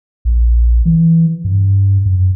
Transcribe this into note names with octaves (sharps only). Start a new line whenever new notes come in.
A#1
E3
G2
F#2